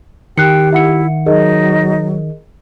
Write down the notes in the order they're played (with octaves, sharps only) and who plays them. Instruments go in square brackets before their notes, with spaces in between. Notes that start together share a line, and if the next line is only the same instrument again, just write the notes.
[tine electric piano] D#3 [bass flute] G4 [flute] G5 [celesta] F#6 C7 C#7
[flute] E4 [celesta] E5 F#5 C#7
[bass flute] F#3 [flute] D#4 [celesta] G#4 A#4 D#5